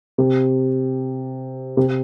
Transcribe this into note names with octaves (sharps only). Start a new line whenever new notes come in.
C3
C3